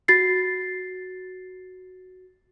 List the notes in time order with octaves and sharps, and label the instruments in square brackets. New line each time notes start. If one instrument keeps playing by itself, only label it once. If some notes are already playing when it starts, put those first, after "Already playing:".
[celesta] F#4 A6 C7